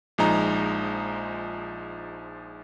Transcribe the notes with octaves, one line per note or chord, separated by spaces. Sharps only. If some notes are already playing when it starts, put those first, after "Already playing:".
A#1 F3 G#3 D#4 A#5